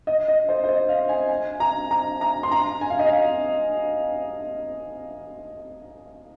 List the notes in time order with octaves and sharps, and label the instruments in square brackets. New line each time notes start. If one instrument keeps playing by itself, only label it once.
[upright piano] D#5
D#5
C5
C5
D#5
F5
G#5
G#5
A#5
A#5
A#5
C6
A#5
G#5
F5
D#5
F5